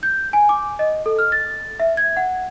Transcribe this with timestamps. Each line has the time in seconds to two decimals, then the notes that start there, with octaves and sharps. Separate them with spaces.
0.03 G6
0.33 G#5
0.49 D6
0.79 D#5
1.06 A4
1.19 F6
1.32 A6
1.80 E5
1.97 G#6
2.17 F#5